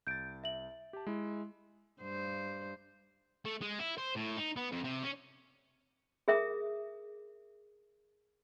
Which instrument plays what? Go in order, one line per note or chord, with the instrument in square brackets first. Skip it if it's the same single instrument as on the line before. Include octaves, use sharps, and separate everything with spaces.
[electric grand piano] C2 A6 [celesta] G6 D7
[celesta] E5 F#7
[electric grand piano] G4 A5
G#3 E4
[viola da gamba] G2 C5
[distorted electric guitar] A3
G#3
E4
C5
A2
D#4
B3
F2
C3
C#4
[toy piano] G#4 A#4 E5 D#6